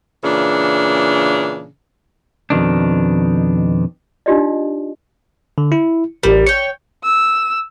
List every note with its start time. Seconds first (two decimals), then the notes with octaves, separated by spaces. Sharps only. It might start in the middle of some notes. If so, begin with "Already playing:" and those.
0.24 A#2 C#3 E3 D4
2.50 F2 B2 D#3 D4
4.26 D4 D#4 F4 G4 D5 D#5
5.58 D3
5.72 E4
6.23 A1 G3 A#4
6.47 C#5 G5 C#7
7.04 E6